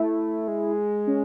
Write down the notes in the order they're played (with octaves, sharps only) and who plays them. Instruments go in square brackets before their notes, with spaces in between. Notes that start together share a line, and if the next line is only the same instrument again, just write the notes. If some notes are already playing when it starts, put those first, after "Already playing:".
Already playing: [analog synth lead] A3 [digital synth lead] E4
[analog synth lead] G#3
[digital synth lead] C#4